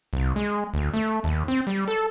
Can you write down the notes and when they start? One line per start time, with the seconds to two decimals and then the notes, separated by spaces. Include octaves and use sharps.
0.13 C2
0.36 G#3
0.74 D2
0.94 A3
1.24 D#2
1.48 C4
1.67 G3
1.88 A4